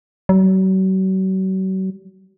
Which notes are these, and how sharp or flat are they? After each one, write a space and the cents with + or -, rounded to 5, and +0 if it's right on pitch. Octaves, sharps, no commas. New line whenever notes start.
F#3 +40